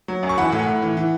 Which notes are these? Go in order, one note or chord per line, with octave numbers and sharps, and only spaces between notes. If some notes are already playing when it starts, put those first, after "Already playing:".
F#3
F#2
C#6
E3 F#5 B5
A2
A2
E3
E3